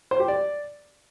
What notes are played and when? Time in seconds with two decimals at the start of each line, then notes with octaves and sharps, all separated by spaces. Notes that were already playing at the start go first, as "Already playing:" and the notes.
0.11 C5
0.20 G4
0.28 D5